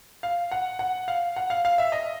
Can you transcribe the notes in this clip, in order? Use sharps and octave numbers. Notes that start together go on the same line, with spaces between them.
F5
F#5
F#5
F5
F#5
F5
F5
E5
D#5